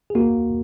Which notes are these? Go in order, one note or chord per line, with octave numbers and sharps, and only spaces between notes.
G#4
A#3 F#4